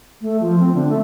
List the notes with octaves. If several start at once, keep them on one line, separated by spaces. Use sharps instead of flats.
A3
F3
C4
D3
A3